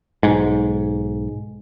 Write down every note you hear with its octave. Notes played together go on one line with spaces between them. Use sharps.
B1 G#2